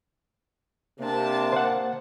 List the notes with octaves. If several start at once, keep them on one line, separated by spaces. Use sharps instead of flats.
C3 A#3 D4 A5
C5 F#5